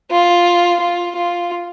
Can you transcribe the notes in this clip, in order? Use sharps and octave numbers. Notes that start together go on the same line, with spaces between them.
F4
F4
F4